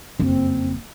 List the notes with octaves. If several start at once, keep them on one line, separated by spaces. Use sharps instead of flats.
F#1 F2 C4